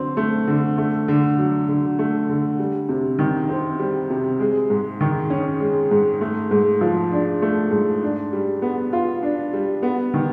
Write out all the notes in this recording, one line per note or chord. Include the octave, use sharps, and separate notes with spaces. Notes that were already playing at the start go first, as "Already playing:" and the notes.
Already playing: D3 F#3 C4
A3
D3
A3
D3
F#3
D3
A3
D3
G3
C3
D#3
C4
G3
C3
G#3
G#2
D#3
C#4
G#3
G#2
A3
G#2
F3
D4
A3
G#2
D4
G3
B3
F4
D4
G3
B3
D#3